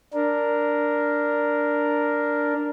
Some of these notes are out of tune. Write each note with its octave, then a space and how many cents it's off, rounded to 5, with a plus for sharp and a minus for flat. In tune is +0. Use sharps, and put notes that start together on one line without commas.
D4 +0 A#4 +0